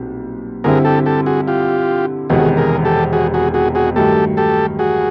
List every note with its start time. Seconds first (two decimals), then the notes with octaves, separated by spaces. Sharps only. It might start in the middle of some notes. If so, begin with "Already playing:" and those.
Already playing: B1 A#2 G3 C4
0.64 G2 D3 G3 C4 E4 G#4 A#4
0.85 G4 A4
1.06 G4 A4
1.26 F#4 G#4
1.48 F4 G4
2.30 E1 E2 C3 D#3 F#4 G#4
2.57 G#4 A#4
2.85 G4 A4
3.13 F#4 G#4
3.34 F#4 G#4
3.54 F#4 G#4
3.75 F#4 G#4
3.96 G2 D#3 F#3 A3 G4 A4
4.37 G4 A4
4.79 F#4 G#4